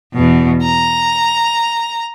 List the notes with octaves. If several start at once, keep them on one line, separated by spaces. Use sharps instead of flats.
E2 B2
A#5